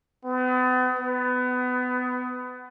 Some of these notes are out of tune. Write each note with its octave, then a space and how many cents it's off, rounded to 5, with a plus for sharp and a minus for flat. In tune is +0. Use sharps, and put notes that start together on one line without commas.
B3 +40
B3 +25